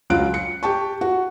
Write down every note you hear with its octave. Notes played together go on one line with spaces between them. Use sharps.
C#2 F#3 F4 F#6 D7
C#7
G4 G5 A5 C#6
F#4